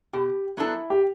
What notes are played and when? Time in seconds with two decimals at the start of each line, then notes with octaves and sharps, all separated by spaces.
0.13 B2 G4
0.57 F#3 B3 D4 E4 A4
0.90 G4